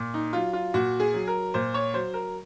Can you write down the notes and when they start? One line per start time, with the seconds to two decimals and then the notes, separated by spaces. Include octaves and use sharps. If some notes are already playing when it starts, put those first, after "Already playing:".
Already playing: A#2
0.14 D#4
0.33 F#3 F4
0.53 F4
0.74 A#2 F#4
1.00 G#4
1.13 F#3
1.27 A#4
1.54 A#2 C5
1.74 C#5
1.93 F#3 C5
2.14 A#4